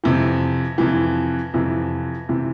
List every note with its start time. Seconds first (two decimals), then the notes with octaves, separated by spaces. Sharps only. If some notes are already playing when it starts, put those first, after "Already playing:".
0.04 F2 C3 E3
0.78 F2 C3 E3
1.54 F2 C3 E3
2.29 C3 E3